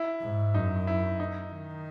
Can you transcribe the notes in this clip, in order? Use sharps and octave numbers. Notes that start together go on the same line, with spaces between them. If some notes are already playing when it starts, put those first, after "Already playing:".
Already playing: E4
G#2
F#2 D#4
E4
D#4
D#3